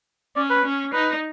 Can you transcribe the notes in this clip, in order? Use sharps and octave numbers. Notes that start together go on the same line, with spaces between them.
C#4 D5
B4
C#4
D#4 B4